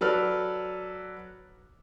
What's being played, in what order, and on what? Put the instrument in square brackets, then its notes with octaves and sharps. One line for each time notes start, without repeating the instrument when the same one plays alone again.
[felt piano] F#3 A4 B4 D5 F6